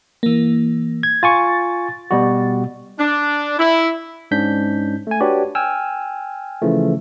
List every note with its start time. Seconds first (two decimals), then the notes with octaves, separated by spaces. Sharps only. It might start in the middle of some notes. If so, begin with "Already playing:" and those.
0.23 E3 A#3
1.03 G#6
1.23 F4 G#5 C#6 A6
2.11 B2 G3 F#4
2.98 D4
3.58 E4
4.31 G#2 C#4 D4 G6 B6
5.07 A3 G#5
5.20 D4 F#4 G4 B4 C#5 D5
5.55 G5 G#5 E6 F6
6.61 C#3 E3 F3 A3